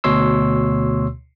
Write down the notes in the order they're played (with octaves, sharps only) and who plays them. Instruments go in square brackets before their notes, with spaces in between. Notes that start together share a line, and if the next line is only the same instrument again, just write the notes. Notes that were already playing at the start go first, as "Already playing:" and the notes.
[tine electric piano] D2 B2 C#5 C6 E6